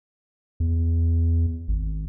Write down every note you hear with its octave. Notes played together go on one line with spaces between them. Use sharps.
E2
G#1